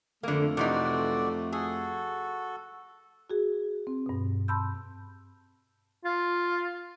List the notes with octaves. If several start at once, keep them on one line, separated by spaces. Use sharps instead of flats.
F2 D3 A3 A#3
C3 E3 D#4 F#4 D5
F#4 G#4 A4
F#4 G#4
C4
G2 B2
A5 B5 C6 E6 G6
F4